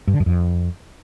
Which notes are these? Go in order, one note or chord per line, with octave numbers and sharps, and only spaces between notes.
G2
D3
F#2
F2